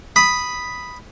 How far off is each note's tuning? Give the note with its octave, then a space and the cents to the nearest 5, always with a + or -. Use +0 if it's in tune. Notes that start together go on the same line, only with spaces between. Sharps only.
B5 +0 D#6 +0